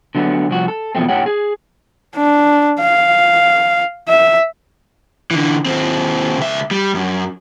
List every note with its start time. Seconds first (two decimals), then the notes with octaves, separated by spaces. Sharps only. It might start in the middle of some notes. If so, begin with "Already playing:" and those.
0.15 D3 F#3 A3 B3
0.50 C2 F3 F#4
0.68 A4
0.95 E2 B2 F3 A3 C4
1.09 A2 G4 C#5 F#5
1.26 G#4
2.16 D4
2.81 F5
4.08 E5
5.31 D3 E3
5.66 D#2 C4
6.38 C#2 E5
6.71 G3
6.94 F#2